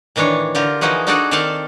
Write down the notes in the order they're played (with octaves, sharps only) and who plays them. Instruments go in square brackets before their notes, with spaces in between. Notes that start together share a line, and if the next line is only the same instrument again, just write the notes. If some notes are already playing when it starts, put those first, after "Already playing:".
[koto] A2 D#3 E3 D4 C#5
D3 F4 G4 A#4
E3 F3 D#4 F#4 G#4
D4 D#4 F#4 G#4 A4 D5
D#3 C4 A4 D5 F5 A5